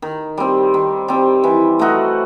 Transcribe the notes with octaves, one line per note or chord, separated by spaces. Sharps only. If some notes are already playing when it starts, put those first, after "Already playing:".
D#3
G3 C4
D#3
G3 C4
E3
A3 D#4 F#4